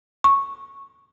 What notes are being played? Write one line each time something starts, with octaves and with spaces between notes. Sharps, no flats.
C#6